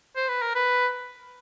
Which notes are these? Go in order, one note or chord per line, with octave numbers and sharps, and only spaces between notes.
C5
B4
A#4
B4